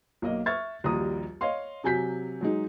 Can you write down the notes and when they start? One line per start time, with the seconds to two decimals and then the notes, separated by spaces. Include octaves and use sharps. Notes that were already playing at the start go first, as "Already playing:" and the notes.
0.22 B1 A#3 D#5
0.46 E5 C#6 F6 G#6 A6
0.84 A#1 D#2 G3 F#4 A#5 D#6
1.41 C#5 D#5 F5 C6
1.84 C3 F#3 G#5 G6 B6
2.41 F#3 G#3 D#4